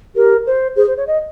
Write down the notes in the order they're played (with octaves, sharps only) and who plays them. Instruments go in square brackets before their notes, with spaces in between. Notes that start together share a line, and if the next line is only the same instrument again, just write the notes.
[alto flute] G4 [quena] A#4
[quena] C5
[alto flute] G#4 [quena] C5
[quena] C5
C#5
D#5